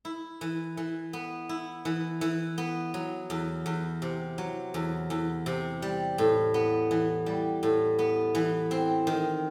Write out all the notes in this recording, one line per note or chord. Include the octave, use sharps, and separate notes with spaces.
E4
E3
E3
B3
E4
E3
E3
B3
F#3
E2
E2
C3
F#3
E2
E2
C3
G3
A2
B3
E3
G3
A2
B3
E3
C4
D#3